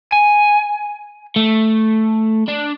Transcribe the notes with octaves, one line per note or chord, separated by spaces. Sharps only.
G#5
A3
D4